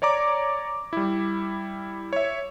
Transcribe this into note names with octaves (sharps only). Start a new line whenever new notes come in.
C#5 D5 A#5 D6
G3 E4
C#5 E5